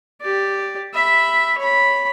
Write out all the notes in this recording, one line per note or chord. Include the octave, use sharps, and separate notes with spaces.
G4 D5
E5 B5
C#5 B5